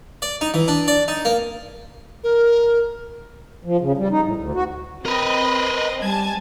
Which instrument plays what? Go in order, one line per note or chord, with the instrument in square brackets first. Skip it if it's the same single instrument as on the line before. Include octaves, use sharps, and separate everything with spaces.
[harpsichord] D5
D#4
E3
D4
D5
D#4
A#3
[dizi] A#4
[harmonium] F3
C#3
G3
D#4
A2
D2
F#4
[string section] C4 D#5 [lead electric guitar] A#4 B4
[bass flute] G3 [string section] G#5 A5 G#6